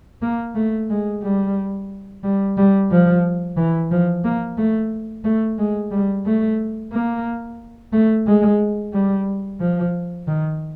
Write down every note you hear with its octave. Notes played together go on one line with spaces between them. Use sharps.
A#3
A3
G#3
G3
G3
G3
F3
E3
F3
A#3
A3
A3
G#3
G3
A3
A#3
A3
G#3
G3
F3
D#3